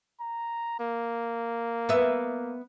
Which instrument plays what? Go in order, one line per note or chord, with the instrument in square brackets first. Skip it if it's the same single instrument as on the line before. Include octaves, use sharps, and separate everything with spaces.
[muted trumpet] A#5
A#3
[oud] B3 E5